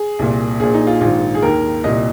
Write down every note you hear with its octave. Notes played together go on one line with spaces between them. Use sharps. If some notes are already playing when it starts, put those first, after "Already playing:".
Already playing: G#4
C2 A#2
A#1 A#2 G#4
D#4
F4
A#1 G#2 D#3 F4
G#4
D#2 D#3 A#4
C2 A#2 D#5